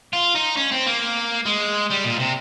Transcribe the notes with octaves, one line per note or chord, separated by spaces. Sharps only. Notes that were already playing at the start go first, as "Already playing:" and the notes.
F4
D#4
C#4
C4
A#3
G#3
G3
A#2
C3